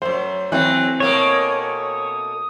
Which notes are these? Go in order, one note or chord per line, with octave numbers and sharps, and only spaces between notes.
F#2 A3 C5
E3 F#3 A3 C4 F#6
B2 A3 A#3 C#5 D#6